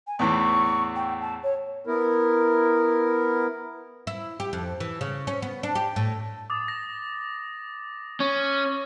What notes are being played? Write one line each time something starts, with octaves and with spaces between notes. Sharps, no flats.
G#5
E2 A2 E3 C#6
G5
A5
C#5
B3 E4 A#4
E4
G4
F2
E3
C#3
C#4
B3
D4
G4
A2
D6 D#6 A6
A#6
C#4 C#6